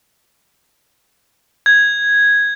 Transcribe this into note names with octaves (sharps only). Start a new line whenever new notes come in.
G#6